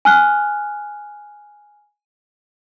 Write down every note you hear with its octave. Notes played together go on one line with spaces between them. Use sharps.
G#5 F6 F#6